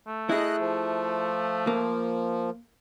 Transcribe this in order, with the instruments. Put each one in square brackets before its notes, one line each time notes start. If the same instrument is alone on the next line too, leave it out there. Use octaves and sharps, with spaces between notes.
[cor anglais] A3
[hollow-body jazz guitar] E4 G#4 [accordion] D#5 F#6
[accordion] F3
[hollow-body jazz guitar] A#3